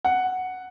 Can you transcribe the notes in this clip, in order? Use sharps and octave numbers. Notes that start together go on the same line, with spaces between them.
F#5